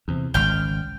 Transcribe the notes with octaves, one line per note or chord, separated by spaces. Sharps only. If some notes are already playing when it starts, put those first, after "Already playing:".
E2 C3
G#1 C#2 G5 F6